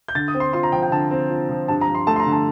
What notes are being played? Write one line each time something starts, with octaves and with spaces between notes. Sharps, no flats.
G6
D3 A6
D#6
C4
C6
F4 C6
A#5
F3 G5
G5
D3 A5
C4
F4
F3
G2 A5
A#5
F3
C6
A3 A5
C6
A#5
D3
A5